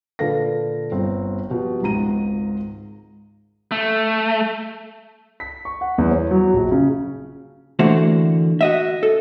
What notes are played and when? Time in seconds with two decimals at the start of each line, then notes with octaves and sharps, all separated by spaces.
0.19 A#2 D3 A4 B4 F5 A#6
0.92 G1 C4
1.50 B2 F3 G4
1.82 G#1 C#2 G#2 A#5 D#7
3.72 A3
5.40 B6
5.65 C#6
5.81 F#5
5.98 E2
6.11 C#5
6.31 F#3
6.54 A#1
6.71 C#3
7.79 D3 E3 A3 A#3 F#4 C5
8.61 F#4 D#5 E5
9.03 A4